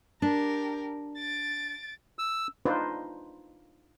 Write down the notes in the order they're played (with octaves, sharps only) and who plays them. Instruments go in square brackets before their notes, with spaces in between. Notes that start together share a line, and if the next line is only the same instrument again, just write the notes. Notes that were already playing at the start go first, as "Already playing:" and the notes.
[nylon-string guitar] D4 [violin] G4 A#4
[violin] A6 D7
[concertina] E6
[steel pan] D4 D#4 F4 B4 C5 D5